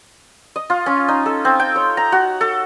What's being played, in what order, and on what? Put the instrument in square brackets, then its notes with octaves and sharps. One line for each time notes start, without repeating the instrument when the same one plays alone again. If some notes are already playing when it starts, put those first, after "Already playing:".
[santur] D#5
F4
C#4
D#4
A4
C4
G5
C#5
A#5
F#4
A4